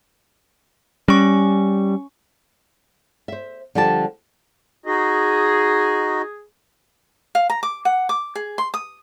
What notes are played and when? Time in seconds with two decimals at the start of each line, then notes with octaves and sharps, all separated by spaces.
1.08 G3 C#4 C#6
3.28 C5 E5
3.75 D3 F3 G3 G4 A5
4.86 D#4 F#4 G#4 D#5
7.35 F5
7.50 A#5
7.63 D6
7.85 F#5
8.09 D6
8.35 G#4
8.58 C6
8.74 D#6